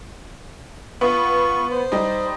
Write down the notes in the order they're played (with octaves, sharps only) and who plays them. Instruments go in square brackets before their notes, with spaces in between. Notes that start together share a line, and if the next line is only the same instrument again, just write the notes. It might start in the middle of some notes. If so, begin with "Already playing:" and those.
[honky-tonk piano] B3 [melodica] F4 C#6
[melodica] C5
[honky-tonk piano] G3 D#4